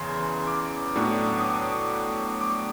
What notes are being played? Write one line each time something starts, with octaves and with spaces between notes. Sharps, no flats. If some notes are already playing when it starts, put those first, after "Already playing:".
Already playing: E2 C#3 E3 C6
D6
A2 F#3 B3 D4
D#6
D6
D6